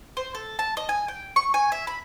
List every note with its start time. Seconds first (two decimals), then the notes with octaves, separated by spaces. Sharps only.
0.17 C5
0.35 A4
0.59 A5
0.77 D#5
0.89 G#5
1.08 G5
1.36 C#6
1.54 G#5
1.72 E5
1.87 B5